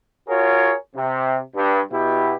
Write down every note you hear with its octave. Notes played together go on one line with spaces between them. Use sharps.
F4 F#4 G#4 A#4 C#5
C3
G2
B2 E4 G4